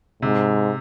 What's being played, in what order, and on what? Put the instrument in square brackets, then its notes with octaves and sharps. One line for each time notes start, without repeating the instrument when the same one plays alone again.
[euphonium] G#2 [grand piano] C3